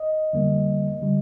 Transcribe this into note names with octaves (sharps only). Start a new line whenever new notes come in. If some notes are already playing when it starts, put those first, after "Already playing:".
Already playing: D#5
F2 D3 G3 A#3
D3 G3